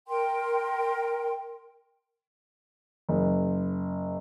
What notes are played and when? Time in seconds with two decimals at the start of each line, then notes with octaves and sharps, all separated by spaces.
0.08 A#4 G5 C6
3.09 F#1